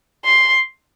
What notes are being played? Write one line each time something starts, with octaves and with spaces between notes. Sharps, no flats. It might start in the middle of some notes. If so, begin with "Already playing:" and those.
C6